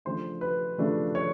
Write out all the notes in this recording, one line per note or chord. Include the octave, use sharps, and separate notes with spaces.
C#3 F3 A3 D4 C5
B4
C#3 F3 A3 D4
C#5